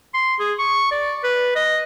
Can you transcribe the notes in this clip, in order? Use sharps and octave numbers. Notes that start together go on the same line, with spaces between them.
C6
G#4
C#6
D5
B4
D#5